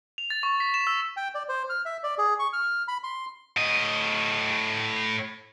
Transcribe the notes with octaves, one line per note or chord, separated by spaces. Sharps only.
F7
A6
C#6
B6
E7
E6
G5
D5
C5
F6
E5
D5
G#4
C#6
F6
B5
C6
A2 D#5